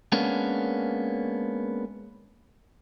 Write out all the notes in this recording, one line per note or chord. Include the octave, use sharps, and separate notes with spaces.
G#3 A#3 B3 C#4 D4